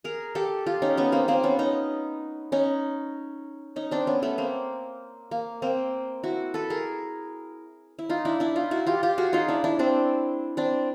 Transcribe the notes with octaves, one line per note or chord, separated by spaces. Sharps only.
G#4 A#4
G4 A4
F4 G4
C#4 D#4
B3 C#4
A#3 C4
A#3 C4
B3 C#4
C#4 D#4
C#4 D#4
C#4 D#4
C4 D4
B3 C#4
A3 B3
A#3 C4
A#3
A#3 C4
E4 F#4
A4 B4
G#4 A#4
E4
D#4 F4
D4 E4
D4 E4
D#4 F4
E4 F#4
F4 G4
F4 G4
F#4 G#4
D#4 F4
D4 E4
D4 E4
C4 D4
C4 D4